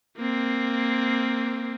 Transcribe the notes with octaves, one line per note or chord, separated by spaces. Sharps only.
A#3 C4